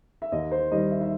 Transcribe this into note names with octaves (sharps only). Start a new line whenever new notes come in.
E5
D#2 D#5
C5
D#3 G3 D#5
E5
E5